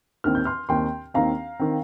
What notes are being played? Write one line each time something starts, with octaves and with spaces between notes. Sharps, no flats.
D#2 D#3 C4 F6
G6
C6 F6
D#2 D#3 C4 G5 C6
D#2 D#3 C4 F5 A#5
D#3 C4